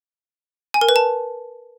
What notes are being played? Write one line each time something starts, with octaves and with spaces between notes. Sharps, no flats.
G#5
A#4
B4
A5